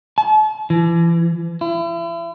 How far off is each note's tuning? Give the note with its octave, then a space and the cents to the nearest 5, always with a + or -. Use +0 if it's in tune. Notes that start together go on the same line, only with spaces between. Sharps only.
A5 -40
E3 +30
E4 +40